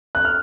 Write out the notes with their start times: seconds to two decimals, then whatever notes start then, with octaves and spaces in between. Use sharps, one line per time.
0.15 F#6
0.25 F6